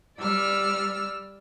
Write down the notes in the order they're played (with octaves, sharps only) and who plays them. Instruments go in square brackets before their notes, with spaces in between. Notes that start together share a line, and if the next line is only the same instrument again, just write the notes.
[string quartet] G3 D5 E6 F6